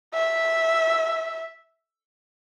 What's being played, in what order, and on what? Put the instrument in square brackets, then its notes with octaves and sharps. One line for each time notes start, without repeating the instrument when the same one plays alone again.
[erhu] E5